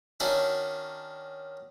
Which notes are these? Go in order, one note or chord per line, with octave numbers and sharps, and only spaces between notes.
D#3 C#4 D4 F#4 E5